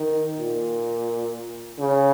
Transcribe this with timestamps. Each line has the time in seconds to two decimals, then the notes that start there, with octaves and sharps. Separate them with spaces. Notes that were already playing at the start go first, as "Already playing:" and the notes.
Already playing: D#3
0.38 A#2
1.79 C#3